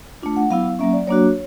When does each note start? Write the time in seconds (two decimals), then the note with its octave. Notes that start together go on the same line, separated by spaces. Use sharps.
0.22 A3 D4 F4
0.36 F#5
0.50 F#3 B3 E4 F5
0.79 F#3 A#3 C#4 E5
0.93 D5
1.07 F#3 A#3 D4 F#4 C#5